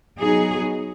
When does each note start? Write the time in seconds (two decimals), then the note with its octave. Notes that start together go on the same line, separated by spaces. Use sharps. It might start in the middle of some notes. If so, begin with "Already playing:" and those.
0.19 F#3 B3 D#4 G#4